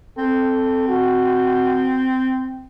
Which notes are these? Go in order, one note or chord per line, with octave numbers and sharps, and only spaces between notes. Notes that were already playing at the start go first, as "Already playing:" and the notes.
C4 A4
F#4